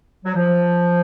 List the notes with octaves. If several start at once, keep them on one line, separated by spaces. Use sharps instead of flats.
F#3
F3